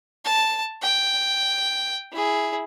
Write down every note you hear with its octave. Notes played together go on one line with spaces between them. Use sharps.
A5
G5
E4 G#4